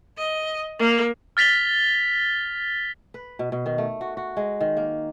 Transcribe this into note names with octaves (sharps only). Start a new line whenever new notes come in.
D#5
A#3
F6 A6 B6 F7 G7
B4
B2
B2
D#3
A3
F#4
F#4
G#3
D#3
A#3